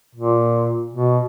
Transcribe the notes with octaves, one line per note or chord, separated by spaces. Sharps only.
A#2
B2